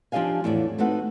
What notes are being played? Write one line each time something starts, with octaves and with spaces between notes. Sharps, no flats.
F3 D4 G4 D#5 F5 G#5
E2 A2 E3 D5
A3 C4 D#4 F#4 B4 F#5